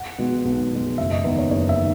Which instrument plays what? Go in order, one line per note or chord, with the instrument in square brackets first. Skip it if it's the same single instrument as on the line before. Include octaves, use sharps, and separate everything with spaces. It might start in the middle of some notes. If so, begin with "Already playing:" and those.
Already playing: [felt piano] F#5
B2 G#3
B1
B2 G#3
F#1 E5
D#5
E2 D#3 B4
C#5
F#1 C#5
E5
D#3